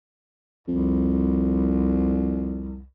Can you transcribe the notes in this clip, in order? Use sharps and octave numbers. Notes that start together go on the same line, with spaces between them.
C2 F2